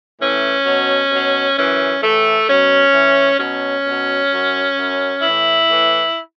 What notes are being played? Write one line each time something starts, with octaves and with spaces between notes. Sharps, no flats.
A2 E3 C#4
B2 F#3
B2 F#3
F#2 E3 C#4
A2 E3 A3
B2 F#3 C#4
A2 E3
B2 F#3 C#4
B2 F#3
F#2 F#3
F#2 F#3
A2 E3 E4
A2 E3